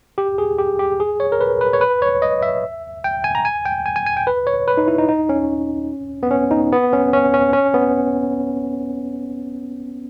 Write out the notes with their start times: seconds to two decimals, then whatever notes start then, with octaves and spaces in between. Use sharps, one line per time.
0.18 G4
0.38 G#4
0.58 G4
0.79 G4
1.00 G#4
1.20 C#5
1.32 A#4
1.41 B4
1.61 B4
1.73 C#5
1.81 B4
2.02 C#5
2.22 D#5
2.42 E5
3.04 G5
3.24 G#5
3.35 A#5
3.45 G#5
3.65 G5
3.86 G#5
3.96 G#5
4.06 G#5
4.17 G5
4.27 B4
4.47 C#5
4.67 B4
4.77 D#4
4.88 E4
4.98 D#4
5.09 D#4
5.29 C#4
6.23 B3
6.31 C#4
6.51 D#4
6.72 B3
6.93 C#4
7.13 C#4
7.34 C#4
7.53 C#4
7.74 B3